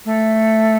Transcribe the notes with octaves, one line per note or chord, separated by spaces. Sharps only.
A3